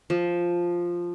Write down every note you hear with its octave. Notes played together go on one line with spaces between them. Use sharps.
F3